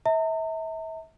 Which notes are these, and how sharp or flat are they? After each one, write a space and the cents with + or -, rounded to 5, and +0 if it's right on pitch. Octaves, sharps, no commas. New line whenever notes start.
E5 -35 A#5 -45